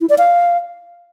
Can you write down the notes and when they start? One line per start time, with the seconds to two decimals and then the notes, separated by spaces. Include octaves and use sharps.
0.01 E4
0.09 D5
0.18 F5